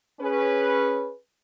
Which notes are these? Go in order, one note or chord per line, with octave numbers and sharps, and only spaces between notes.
C#4 G#4 B4